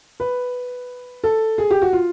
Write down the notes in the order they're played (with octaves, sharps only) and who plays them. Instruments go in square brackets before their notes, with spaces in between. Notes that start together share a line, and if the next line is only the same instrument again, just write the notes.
[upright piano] B4
A4
G#4
G4
F#4
F4